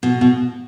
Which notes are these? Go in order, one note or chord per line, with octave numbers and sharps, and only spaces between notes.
B2
B2